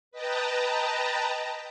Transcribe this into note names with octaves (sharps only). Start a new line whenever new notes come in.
B4 D#5 G5 A5 A#5